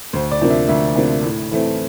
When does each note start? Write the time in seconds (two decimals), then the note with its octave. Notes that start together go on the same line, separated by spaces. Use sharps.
0.13 D2 C5
0.31 D5
0.41 C3 F3 A#3 D4
0.50 E5
0.68 D2 E5
0.96 C3 F3 A#3 D4
1.24 A2
1.51 E3 A3 C4